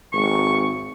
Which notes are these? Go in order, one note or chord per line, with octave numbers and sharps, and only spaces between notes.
G#1 C#6